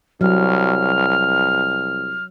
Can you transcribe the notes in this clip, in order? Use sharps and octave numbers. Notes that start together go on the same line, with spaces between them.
C2 F#3 F6